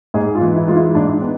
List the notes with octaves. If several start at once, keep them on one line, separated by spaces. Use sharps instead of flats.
G#2 G#4
F4
E3
E4
G#3 F4
E4
G#2 D4
B3